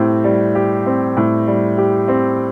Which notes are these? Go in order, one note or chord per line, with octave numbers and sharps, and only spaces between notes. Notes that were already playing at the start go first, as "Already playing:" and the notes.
Already playing: A2 C4 G4
G3
G4
C4
A2
G3
G4
C4